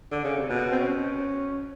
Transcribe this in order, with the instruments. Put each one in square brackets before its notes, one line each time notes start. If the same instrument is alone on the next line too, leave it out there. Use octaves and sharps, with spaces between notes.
[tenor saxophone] D3
C#3
C3
B2
[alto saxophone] C4
C#4